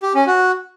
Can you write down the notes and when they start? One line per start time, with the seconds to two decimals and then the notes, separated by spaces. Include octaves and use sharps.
0.03 G4
0.15 C#4
0.27 F#4